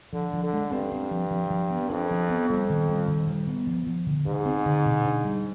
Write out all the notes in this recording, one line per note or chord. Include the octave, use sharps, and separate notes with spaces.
D3 F3
F3
D3
G#3
G2 C4
C4
F3
F3
F3
B3
F2 D4
F3
B3
F2 G3
D#3
G3
D#3
G3
B3
F3
F3
D3
G#2 D3
C4
D3
B2
D4
G3